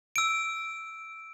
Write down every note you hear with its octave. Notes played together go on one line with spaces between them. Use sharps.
E6 D7